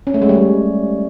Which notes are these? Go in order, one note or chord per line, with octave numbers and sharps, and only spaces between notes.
C#4
A3
G#3
G3